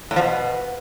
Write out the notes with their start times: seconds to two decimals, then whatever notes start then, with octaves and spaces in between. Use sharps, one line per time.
0.11 A2
0.16 F3
0.21 B2